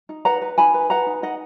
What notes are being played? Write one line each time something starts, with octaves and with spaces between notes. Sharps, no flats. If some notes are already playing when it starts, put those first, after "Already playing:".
D#4
B4 F#5 A#5
B4
D#4 G#5 B5
B4
B4 F#5 A#5
D#4
D#4 D#5 F#5